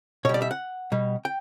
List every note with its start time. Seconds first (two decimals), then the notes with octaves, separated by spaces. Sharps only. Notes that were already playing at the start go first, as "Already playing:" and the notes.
0.25 B2 C#5
0.29 G3
0.34 D5
0.42 E5
0.51 F#5
0.92 B2 G3
1.25 G5